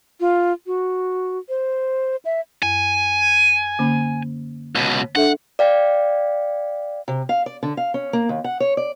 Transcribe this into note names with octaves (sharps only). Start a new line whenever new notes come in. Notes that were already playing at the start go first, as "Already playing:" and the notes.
F4
F#4
C5
E5
F#2 G#5
D3 A#3 C#4
C#2 B2
D4 A4 E5 F#5
D5 F5 G5
C3
F5
D5
D3
F5
C#4
A#3
D#2
F#5
C#5
D5